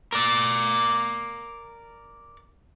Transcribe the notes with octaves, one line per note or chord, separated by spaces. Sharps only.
A#4 D5